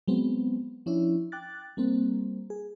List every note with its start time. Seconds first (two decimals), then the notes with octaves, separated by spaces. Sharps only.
0.08 F#3 G#3 B3 C4
0.86 F3 C#4 D4 E4
1.32 G5 D6 F#6 A6
1.77 G3 A#3 C4
2.50 G#4